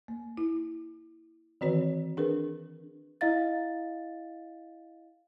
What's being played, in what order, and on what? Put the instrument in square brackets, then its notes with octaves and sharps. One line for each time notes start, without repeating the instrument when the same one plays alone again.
[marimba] A#3
E4
D#3 E3 C4 F#4 B4 C#5
D4 G#4 A#4 B4
[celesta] E4 D#5 F5 A6